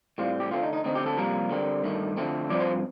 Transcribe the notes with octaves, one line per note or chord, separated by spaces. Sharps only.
A2 G3 C4 F4
G4
D3 A3 C4 F4
D#4
D#4
D3 A3 C4 D#4
G4
A4
F2 C3 G3 A#3 A#4
D3 G3 C4
G2 D#3 A3
D3 F3 A3 C4
G2 F3 C4 D5
C5